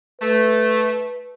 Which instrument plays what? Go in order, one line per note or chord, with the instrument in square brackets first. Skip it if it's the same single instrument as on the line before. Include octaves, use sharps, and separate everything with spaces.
[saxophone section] A3 [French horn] B4